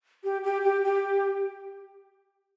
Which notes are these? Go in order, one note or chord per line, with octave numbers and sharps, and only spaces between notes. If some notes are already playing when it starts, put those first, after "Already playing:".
G4
G4
G4
G4